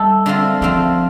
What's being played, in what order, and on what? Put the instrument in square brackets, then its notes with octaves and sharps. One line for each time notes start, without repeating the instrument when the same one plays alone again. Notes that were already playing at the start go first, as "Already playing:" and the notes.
Already playing: [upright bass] G3 [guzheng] A3 D#4 A4
[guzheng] D3 A3 C4 F4
[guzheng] D3 A3 C4 F4 [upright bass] F3